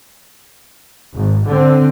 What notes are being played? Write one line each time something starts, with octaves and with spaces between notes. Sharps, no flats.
G#1
D3 C4